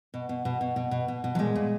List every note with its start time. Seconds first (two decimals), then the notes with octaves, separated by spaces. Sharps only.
0.14 B2
0.29 B2
0.45 B2
0.61 B2
0.76 B2
0.91 B2
1.08 B2
1.24 B2
1.35 F#3
1.39 A#2 G#3
1.56 A#2